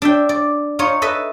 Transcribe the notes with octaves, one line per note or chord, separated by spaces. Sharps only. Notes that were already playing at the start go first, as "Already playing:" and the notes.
D4 E5 G5
D5
D#4 F4 C#5
A4 B4 D#5 E5